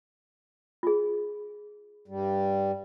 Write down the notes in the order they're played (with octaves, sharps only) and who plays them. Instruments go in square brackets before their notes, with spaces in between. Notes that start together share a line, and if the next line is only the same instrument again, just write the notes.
[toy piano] F4 G#4
[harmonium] G2 G3